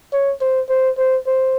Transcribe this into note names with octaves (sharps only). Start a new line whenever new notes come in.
C#5
C5
C5
C5
C5